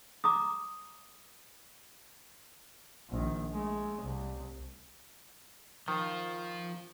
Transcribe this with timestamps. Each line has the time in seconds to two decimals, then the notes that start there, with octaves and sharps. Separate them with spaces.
0.24 A#5 D6 D#6
3.10 A#1 D#3
3.52 G#3 A3
4.02 C2
5.88 D#3 F3 F4